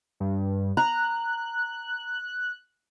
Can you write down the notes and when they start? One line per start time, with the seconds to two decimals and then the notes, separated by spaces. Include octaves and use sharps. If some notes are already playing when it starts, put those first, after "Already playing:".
0.20 G2
0.77 A#5 F#6